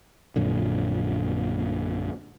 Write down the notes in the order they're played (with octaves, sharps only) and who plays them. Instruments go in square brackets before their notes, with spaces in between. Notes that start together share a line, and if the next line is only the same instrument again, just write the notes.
[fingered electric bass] A#1 F#2 A#2 D3